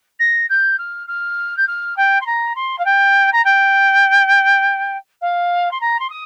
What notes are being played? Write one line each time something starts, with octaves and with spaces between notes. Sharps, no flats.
A#6
G6
F6
F6
G6
F6
G5
C6
A#5
C6
F5
G5
A#5
G5
F5
C6
A#5
C6
D#6